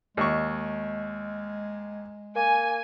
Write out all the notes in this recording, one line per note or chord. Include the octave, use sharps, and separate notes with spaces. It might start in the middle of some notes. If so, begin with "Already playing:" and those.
D#2 G#3 C#6
A#3 G#5